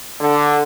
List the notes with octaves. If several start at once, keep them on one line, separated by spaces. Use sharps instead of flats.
D3